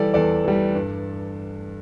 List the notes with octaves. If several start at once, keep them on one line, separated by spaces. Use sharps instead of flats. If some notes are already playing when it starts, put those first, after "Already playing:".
Already playing: E3 G3 G4 A4 D5
E2 A4 D5
E3 G3
G2